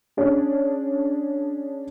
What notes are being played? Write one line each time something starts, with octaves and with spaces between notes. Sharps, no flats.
C#4 D4 G#4